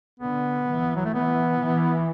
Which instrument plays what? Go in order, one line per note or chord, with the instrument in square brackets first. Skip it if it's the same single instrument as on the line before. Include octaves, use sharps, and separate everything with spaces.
[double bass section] D3 [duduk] B3
[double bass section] E3
[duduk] F#3
A3
[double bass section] E3 [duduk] B3
[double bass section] E3